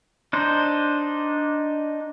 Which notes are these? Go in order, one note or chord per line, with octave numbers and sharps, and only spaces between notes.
D4 D#4 C5